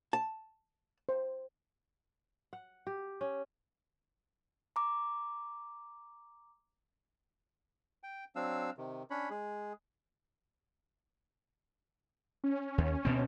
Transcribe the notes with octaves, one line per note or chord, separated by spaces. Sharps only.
A5
C5
F#5
G4
C#4
A#5 D6
G5
F#3 C4 D4 F5 E6
C3 D#3
C#4 D4 C#5 B5
G#3 G#4
C#4
D#2
D2 B2 C4